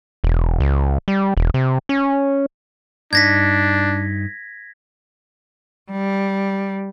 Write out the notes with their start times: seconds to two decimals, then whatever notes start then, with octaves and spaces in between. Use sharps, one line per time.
0.24 E1
0.60 C#2
1.08 G3
1.37 E1
1.54 C3
1.89 C#4
3.13 G2 D4 D#4 G#6 A#6 B6
5.91 G3